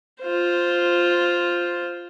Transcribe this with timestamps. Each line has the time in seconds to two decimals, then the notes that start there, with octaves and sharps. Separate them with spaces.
0.21 F4 C5